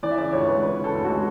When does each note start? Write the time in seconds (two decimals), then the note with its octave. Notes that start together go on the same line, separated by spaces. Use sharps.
0.03 E3 D5
0.11 E5
0.18 C#3 D5
0.33 D2 C#5
0.48 G#3 B4
0.63 E3 B4
0.78 C#3
0.84 A4
0.93 D2
1.05 F#4
1.10 G#3